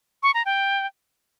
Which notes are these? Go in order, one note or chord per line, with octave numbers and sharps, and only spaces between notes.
C#6
A#5
G5